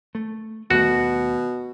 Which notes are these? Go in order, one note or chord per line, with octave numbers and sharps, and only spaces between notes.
A3
D#2 B2 G3 A3 F#4